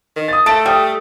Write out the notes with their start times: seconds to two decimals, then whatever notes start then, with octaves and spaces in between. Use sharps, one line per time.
0.16 D#3
0.28 D#6 A6
0.46 A3 A4 A6 D7
0.66 G3 G5 D#6